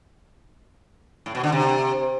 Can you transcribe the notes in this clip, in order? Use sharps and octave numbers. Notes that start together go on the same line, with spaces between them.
A2
B2
D3
C3